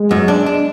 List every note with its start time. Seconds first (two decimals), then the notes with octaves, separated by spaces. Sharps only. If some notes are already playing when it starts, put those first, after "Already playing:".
Already playing: G#3
0.11 F#2
0.28 D4
0.46 D4